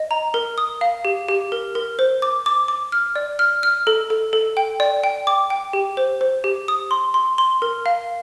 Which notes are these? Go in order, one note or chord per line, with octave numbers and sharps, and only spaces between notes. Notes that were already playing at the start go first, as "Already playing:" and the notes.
Already playing: D#5
A#5
A#4
D#6
F5
G4
G4
A#4
A#4
C5
D6
D6
D6
F6
D5
F6
F6
A4
A4
A4
G5
D5
G5
D6
G5
G4
C5
C5
G4
D#6
C6
C6
C6
A#4
F5